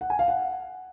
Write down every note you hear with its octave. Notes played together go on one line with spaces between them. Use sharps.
F#5
G#5
F5
F#5